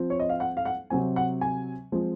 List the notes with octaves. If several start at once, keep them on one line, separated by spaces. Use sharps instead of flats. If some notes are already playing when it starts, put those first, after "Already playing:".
Already playing: F3 C4
C#5
D#5
F5
F#5
F5
F#5
C3 F#3 C4 G#5
F#5
G#5
F3 G#3 C4